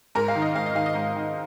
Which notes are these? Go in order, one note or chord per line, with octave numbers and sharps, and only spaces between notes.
G#2 A#4
F5
D#3
D#5
G#2 F5
D#5
D#3 F5
D#5
G#2
D#3